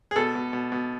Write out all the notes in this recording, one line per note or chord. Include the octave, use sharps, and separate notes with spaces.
G#4
B2 A4
B2
B2
B2